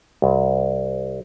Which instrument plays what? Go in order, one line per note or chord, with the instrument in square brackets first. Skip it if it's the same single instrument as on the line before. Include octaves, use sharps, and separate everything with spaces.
[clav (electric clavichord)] C2